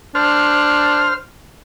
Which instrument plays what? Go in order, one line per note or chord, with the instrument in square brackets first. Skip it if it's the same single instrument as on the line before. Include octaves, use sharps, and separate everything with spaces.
[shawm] D4 [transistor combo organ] C5 F6